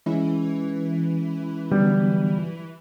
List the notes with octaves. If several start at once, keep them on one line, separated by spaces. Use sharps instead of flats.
E3 G#3 C#4 E4
D3 F#3 G3 B3